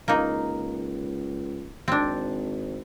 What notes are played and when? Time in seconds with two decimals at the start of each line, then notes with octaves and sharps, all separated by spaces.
0.08 C#2 A#3 D#4
1.88 G#1 C4 D4